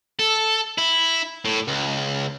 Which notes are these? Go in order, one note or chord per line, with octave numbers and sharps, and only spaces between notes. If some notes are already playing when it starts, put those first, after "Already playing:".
A4
E4
A2
C#2